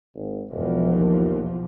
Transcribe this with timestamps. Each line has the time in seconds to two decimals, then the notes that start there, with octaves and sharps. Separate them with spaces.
0.15 G#1
0.50 E1 B1 E2 F3
0.93 D#2